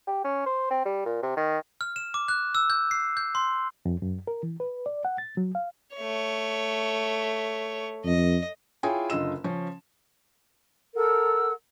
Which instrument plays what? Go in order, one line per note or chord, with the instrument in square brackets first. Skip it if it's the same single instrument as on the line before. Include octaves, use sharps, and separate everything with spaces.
[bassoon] G4
C#4
C5
C4
G3
A#2
C3
D#3
[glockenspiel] F6
E7
D6
F#6
E6
G6
C7
G6
C6
[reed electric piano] F2
F#2
A#4
E3
B4
D5
F#5
A6
F#3
F5
[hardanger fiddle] A3 C#5
[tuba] F2 [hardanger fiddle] D#5
[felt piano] E4 F4 G#4 C#5 G5 G#5
F#1 D3 F4 D#5 E6 E7
C#3 F3 C#4
[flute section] A4 A#4 F#5 E6